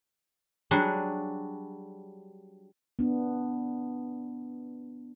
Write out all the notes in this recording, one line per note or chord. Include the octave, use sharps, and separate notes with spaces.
F#3 G3 D4 F#4 G#4
B3 D4